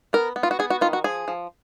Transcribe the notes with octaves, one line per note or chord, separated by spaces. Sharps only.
B3 A#4
B3
F4
F#4
B3 G#4
F#4
D#3 F4
F#4
F3 G#4
F3